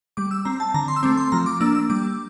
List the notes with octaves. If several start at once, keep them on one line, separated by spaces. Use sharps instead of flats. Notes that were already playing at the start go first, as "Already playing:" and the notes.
G3 D6
E6
C4 A#5
A5
D3 A#5
C6
E6
A3 C4 D6
C6
F3 A#5
D6
A#3 D4 E6
E6
G3 D6